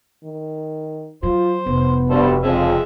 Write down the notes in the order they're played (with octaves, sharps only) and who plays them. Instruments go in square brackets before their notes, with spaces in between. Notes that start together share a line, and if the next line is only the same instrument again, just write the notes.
[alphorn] D#3
[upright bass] F#3 [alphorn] F4 [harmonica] C5
[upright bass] F1 [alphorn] B3
[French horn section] G2 B2 [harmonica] A4 C5
[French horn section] F2 [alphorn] C#3 [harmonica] G#3 E5